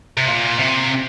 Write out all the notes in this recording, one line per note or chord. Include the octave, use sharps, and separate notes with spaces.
C3
A#2
C3